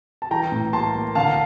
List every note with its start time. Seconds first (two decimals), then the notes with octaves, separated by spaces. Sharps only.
0.22 A5
0.31 E3 G5 A#5
0.52 A2
0.73 A#3 A5 C6
0.95 A#3
1.15 D3 F5 A5
1.28 A5